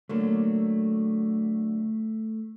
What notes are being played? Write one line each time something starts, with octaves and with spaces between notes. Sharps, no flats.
D3 F#3 A3 A#3